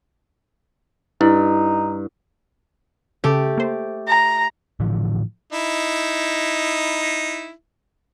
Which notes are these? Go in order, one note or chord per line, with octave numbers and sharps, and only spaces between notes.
G2 D#4 E4
C#3 A3 C#4 G4
A#3 C5
A#5
A2 D3 E3 F3
D#4 E4